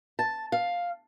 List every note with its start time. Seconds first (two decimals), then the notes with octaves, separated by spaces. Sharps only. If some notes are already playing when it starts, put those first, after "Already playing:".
0.19 A5
0.52 F5